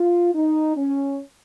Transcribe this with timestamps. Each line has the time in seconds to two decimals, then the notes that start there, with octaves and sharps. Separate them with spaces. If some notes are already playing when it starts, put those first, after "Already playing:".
Already playing: F4
0.35 D#4
0.76 C#4